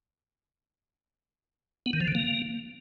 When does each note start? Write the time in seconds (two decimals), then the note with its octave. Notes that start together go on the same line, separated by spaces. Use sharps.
1.86 B3
1.93 D#3
2.00 F3
2.08 D3
2.15 A#3